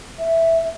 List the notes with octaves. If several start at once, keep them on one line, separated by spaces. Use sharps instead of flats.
E5